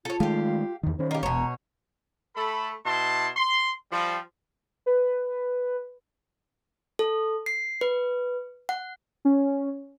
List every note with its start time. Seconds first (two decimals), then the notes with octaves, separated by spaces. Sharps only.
0.05 F4 A4 C#5
0.20 D#3 G#3 A3 G4 F5
0.83 E2 D#3
0.99 D#3 C#4 C5
1.11 A#3 G4 D#5
1.23 E1 B2 C#5 A#5
2.35 A3 A4 B5
2.85 B2 E4 A5 C6
3.36 C6
3.92 F3 G3
4.86 B4
6.99 A4
7.46 C7
7.81 B4
8.69 F#5
9.25 C#4